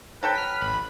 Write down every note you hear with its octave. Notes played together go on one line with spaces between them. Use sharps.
F#3 A4 B4 G5
F6 B6
A1 B5